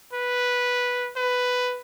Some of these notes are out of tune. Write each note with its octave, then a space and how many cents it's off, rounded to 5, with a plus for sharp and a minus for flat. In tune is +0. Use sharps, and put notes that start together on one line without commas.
B4 -5
B4 +10